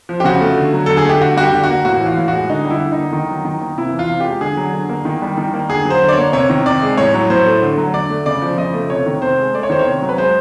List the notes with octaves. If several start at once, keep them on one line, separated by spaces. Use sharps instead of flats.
F3
G4
C#3 F#4
A3
D3
F#3
D3 A4
G#4
A3 G4
D3 F#4
G3 F#4
G4
D3
F#4
A#3
A2 F#4
E3
F4
A2
F#4
G#3
D3 D#4
G3
E4
D3
D#4
A#3
D#3
F#3
D#3
A#3
C3 E4
E3
F4
C3
G4
G#3
D3 G#4
F#3
D3
A#3
D#3
G3
D#3
A#3
D3 G#4
F#3
C5
D3
D5
A#3 C#5
C3 C#5
D#3
C3 D5
G#3
A2 C#5
F#3
A2 C5
A3
D3
F#3
D3 D5
A3
C#3 D5
F3
C#3 D#5
A3
C3 C#5
D#3
C3 C5
G#3
A3 D5
C#5
D#3 C5
C#5
C3
F#3
B4
G#3 C5